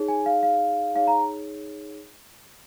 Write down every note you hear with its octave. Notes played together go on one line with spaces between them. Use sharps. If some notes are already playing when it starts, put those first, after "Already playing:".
Already playing: D#4 G#4 C#5
G#5
F5
F5
D#4 G#4 C#5 F5
A#5